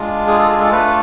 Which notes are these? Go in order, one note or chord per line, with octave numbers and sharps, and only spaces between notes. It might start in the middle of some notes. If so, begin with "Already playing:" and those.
Already playing: G#3 D4 F4
G#4
A4
G#4
A4
A3 D4 F4 B4